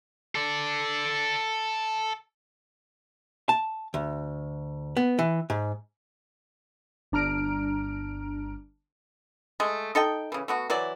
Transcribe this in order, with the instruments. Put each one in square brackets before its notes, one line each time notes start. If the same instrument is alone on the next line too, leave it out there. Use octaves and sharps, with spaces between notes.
[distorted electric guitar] A4 D5
[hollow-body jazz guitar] A5
D2
B3
E3
G#2
[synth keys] G1 D4 A#5 F6 D7
[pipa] G#3 A3
D#4 A4 D#5 G5
C#3 E3
A3 B3 F#4
E3 F#3 E4 D5